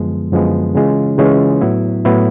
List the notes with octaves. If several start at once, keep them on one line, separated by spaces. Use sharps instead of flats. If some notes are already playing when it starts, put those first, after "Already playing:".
Already playing: F#2 D3 F3 G#3 B3
F#2 D3 F3 G#3 B3
C#3 E3 G#3 C#4 F4
C#3 E3 G#3 C#4 F4
A2 F#3 B3 E4
A2 F#3 B3 E4